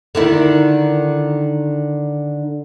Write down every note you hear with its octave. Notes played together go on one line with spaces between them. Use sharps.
D3 D#3 E4